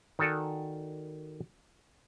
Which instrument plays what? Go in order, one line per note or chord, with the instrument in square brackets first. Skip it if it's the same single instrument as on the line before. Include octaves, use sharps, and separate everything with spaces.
[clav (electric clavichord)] D#3 F#4 A4 D5 G#5